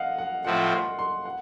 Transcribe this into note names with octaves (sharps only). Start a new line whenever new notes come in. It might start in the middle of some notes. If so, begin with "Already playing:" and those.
Already playing: D#5 F5 F#5
F#5
A2 F3 A3 C4 F#5
C6
C6
F#5